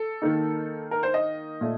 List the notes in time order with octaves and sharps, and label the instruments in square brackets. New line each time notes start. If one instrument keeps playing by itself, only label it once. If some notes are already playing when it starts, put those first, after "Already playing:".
Already playing: [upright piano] A4
D#3 A#3 D#4
A#4
C5
D#5
A#2 A3